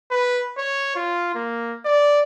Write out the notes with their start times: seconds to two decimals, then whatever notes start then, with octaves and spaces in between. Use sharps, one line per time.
0.11 B4
0.57 C#5
0.96 F4
1.35 A#3
1.85 D5